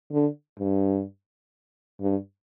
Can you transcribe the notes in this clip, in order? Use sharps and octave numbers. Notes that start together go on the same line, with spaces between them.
D3
G2
G2